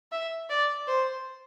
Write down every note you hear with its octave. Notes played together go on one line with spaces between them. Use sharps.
E5
D5
C5